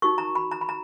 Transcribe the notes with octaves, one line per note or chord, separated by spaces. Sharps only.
D#4 F#4 A#4 C#6
A#5
B5
A#5
B5
A#5